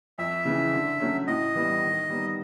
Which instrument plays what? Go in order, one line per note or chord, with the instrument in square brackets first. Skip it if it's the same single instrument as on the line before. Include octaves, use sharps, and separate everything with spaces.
[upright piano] F2 [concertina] E5
[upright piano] C#3 E3
D3
F#3 A3 C#4
[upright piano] A2 [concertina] D#5
[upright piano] E3 G3 B3
D#3
G3 B3 D#4